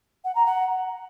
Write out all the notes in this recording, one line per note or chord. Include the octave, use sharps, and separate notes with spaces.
F#5
A#5
F#5